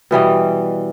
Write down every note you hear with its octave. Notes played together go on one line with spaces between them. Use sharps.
B2 E3 G3 D#5